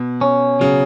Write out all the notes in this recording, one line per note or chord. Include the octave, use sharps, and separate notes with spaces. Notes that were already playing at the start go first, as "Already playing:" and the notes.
Already playing: B2
C#4
C#3 F#3